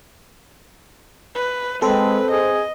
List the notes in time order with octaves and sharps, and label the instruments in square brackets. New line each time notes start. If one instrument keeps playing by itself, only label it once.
[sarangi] B4
[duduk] G#3 [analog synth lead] C4 [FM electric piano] A4 [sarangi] B4
[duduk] G#4 [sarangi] D#5